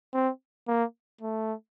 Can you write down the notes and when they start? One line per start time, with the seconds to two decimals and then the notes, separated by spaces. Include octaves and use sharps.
0.13 C4
0.68 A#3
1.21 A3